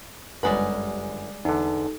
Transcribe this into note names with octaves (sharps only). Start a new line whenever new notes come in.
G1 F#2 G3 G#3 B4
E2 D3 D#4 A4